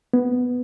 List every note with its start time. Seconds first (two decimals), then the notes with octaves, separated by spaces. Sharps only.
0.14 B3